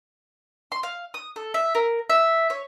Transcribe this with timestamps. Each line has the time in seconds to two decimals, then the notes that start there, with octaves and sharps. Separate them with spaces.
0.72 C6
0.83 F5
1.14 D#6
1.36 A4
1.54 E5
1.75 A#4
2.10 E5
2.50 C#5